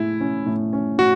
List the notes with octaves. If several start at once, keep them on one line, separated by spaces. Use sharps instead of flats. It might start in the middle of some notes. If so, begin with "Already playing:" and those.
Already playing: A2 G#3 E4
C#4
A2
C#4
A2 F#4